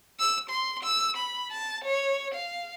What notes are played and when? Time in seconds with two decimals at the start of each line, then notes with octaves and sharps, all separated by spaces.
0.19 E6
0.50 C6
0.83 E6
1.17 B5
1.51 A5
1.84 C#5
2.34 F5